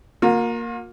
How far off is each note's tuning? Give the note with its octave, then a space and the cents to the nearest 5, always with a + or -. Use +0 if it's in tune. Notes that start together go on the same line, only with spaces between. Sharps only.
A#3 +0 F4 +45